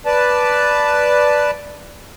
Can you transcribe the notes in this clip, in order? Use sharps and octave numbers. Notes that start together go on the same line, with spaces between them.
B4 D5 A5